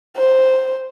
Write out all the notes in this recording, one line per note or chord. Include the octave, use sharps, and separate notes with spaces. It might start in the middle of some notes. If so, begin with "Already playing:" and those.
C5